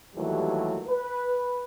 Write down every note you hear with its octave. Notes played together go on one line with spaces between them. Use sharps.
D#2 E3 F#3 G3 A3
B4